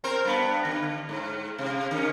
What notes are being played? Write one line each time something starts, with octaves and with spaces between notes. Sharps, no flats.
C4 A#4 C5
G2 B3
D3
G#2
C3
D3 C#4